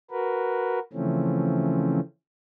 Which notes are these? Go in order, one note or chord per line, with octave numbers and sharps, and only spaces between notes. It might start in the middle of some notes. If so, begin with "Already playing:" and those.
F#4 A#4 B4
C#3 E3 F3 A3 C4 C#4